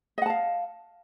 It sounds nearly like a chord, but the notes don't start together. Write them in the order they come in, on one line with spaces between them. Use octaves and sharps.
D#5 F#5 A5 F5